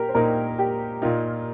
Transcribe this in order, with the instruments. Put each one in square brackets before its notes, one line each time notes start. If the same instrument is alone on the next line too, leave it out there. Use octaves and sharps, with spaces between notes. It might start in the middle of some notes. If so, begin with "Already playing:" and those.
Already playing: [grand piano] A#2 A#3 [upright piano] G4 A#4
[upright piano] C5
[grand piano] A#2 A#3 D#4 [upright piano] A#4
[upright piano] G4
[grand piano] A#2 A#3 D#4 [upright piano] F4